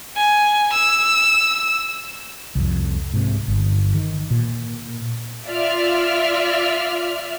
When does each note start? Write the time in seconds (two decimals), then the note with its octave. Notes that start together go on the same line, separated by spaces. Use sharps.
0.17 G#5
0.73 E6
2.55 C2 F2
3.14 G#2 C3
3.48 G1
3.94 D#3
4.31 A#2
5.46 F4 D5 E5 F6